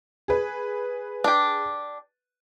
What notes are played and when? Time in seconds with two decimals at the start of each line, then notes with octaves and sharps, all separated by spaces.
0.28 G#4 B4
1.24 D4 G4